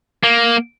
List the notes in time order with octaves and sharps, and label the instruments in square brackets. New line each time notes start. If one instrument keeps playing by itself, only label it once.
[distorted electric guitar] A#3